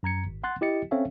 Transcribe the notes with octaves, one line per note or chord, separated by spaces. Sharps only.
F#2 A#5 G#6 C#7
G#1
F#5 C6 F#6 A6
E4 G4 D#5 A6 C#7
C4 C#4 A4 C#5 E5 F5